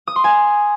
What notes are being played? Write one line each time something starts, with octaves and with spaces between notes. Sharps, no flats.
D#6
C6
G#5